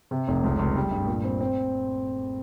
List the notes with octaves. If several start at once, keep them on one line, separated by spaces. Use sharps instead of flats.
C3
F1
C#2
C#2
G3
G2
A#2
C4
C4